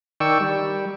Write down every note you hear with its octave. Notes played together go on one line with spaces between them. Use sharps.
D#3 D5 G5 C#6 E6
G3